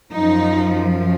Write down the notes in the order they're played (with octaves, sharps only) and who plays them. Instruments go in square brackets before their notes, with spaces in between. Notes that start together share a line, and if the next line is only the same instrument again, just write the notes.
[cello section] F#2 F3 D#4